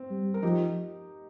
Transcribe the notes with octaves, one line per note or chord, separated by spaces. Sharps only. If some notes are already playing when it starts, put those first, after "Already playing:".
Already playing: C4
G3
A#4
F3 D#4 G4